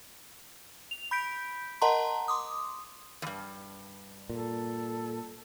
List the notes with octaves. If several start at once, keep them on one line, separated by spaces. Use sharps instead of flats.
F7
B5 G6 B6 D7
A#4 D#5 F#5 A5 A#5 C6
C6 D6 D#6
E2 G2
A#2 A4